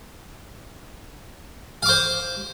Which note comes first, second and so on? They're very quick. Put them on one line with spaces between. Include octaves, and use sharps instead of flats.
F5 D6 C5